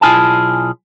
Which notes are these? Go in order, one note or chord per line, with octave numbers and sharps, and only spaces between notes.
B1 E4 F4 G#4 G#5 A5